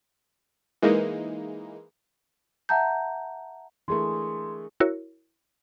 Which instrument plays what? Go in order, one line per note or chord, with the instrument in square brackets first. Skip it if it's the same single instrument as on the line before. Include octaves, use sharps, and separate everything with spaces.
[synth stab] E3 G#3 A#3 D#4
[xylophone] E5 F#5 A5 A#5 G6
[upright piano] E3 A3 [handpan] D4 G#4 A#4 [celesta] C6
[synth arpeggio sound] E4 F#4 A#4 C#5